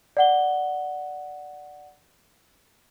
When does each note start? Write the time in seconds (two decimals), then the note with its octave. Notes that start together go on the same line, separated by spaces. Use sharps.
0.17 D5 F#5 G7